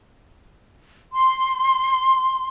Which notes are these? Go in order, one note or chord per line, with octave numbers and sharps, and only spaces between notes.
C6